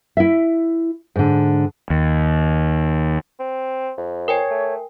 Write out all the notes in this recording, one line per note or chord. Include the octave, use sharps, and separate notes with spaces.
E4 E5
G#2 D3
D#2
C4
F2
A#4 C#5 G5 G#5
A3